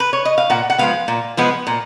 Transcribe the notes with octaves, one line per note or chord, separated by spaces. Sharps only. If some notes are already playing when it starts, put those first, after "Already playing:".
B4
C#5
D#5
F5
A#2 F#5
F#5
F3 G#3 B3 F5
A#2
F3 G#3 B3
A#2